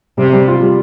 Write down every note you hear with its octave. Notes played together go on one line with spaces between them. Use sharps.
C3 G3
G3
F4
G3